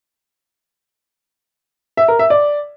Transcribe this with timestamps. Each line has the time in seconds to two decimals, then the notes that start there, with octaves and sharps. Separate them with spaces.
1.97 E5
2.08 A#4
2.19 E5
2.30 D5